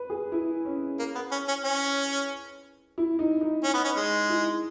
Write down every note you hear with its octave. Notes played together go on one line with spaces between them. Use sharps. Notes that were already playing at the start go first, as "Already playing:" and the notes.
Already playing: B4
G#4
E4
C#4
A#3
B3
C#4
C#4
C#4
E4
D#4
D#4
C#4
B3
C#4
G#3
E4